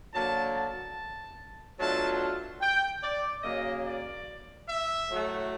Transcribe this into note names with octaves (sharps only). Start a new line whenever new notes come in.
D3 F#3 A#3 A5
A5
B2 F#3 A3 D4 F4 A5
G5
D5
C#3 F#3 A#3 D#5
D5
E5
A2 F#3 A3